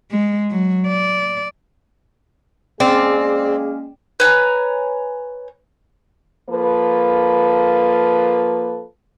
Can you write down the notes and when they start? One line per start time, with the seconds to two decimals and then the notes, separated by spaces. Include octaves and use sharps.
0.12 G#3
0.51 F#3
0.88 D5
2.80 G#3 A#3 C4 C#4 G#4 D5
4.20 B4 C#5 G#5 A#5
6.50 F3 A#3 A4 B4